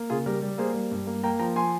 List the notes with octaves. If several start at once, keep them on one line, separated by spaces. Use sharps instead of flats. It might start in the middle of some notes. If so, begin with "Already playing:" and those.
Already playing: A#3
C#3 F4 G#4
G3 G4 A#4
G3
A#3 G#4 C5
G3
G2
A#3
A#3 G5 A#5
F3 G5 A#5
F3 G#5 C6